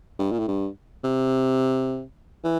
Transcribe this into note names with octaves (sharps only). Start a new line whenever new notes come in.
G2
A#2
A2
G2
C3
E3